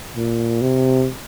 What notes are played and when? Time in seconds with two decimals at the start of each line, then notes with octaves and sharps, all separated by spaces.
0.16 A#2
0.62 C3